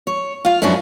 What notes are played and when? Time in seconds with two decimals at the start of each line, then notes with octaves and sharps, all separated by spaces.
0.07 C#5
0.45 F4 F5
0.62 F#2 F3 F#3 C#4 D4 E4